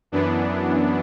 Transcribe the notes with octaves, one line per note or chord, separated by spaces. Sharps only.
F#2 E3 B3 D4